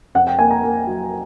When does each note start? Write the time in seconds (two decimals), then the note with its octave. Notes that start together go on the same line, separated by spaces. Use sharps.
0.15 F2 F#5
0.27 G5
0.39 A#3 G#5
0.51 A#5
0.63 A#3
0.87 F#3